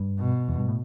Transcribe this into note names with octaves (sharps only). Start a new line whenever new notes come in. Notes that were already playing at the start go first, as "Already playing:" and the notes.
Already playing: G2
B2
E2
G2
A2